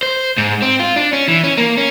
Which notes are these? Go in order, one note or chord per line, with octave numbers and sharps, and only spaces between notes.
C5
G#2
C4
F4
D4
C#4
E3
C#4
A#3
C#4